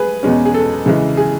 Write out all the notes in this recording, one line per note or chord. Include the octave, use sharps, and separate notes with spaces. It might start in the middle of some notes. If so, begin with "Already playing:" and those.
Already playing: G#4 B4
E2 B2 G#3 C#4
G#4
A4
C#3 E3 G#3
G#4